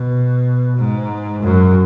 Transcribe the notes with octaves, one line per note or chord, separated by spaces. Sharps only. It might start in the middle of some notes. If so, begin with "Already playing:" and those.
Already playing: B2
G#2
F#2